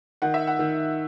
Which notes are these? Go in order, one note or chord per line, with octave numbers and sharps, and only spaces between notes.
D#3 F#5
E5
F#5
D#3